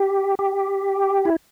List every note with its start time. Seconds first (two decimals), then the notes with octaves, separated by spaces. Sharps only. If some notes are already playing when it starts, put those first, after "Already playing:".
Already playing: G4
0.39 G4
1.25 E4